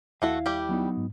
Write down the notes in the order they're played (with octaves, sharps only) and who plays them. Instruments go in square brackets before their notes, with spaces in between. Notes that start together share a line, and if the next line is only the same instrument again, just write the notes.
[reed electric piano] D#2 E4 [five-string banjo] A3 F#4 A4 [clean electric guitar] F5
[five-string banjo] G3 G4
[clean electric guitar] F#3 B3 D#4
[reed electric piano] G#2